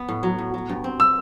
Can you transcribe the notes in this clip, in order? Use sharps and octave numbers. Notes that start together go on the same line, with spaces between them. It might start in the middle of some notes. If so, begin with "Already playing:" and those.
Already playing: B3
A2
F#3
A2
F#3
G2
C4
E6